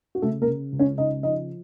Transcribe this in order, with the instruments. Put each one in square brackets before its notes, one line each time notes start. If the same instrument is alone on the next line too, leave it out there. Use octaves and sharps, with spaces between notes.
[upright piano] F#4
C#3 A3 A4
A#3 A#4
C#3
C#2
C#4 C#5
C#3 D#4 D#5
F3 D#4 D#5